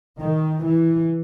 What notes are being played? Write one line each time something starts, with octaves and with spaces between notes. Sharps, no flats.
D#3
E3